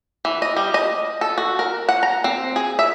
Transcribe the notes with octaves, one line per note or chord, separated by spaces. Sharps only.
E3
D#5
G3
D#5
A4
F#4
A#4
F#5
A#5
C4
G#4
E5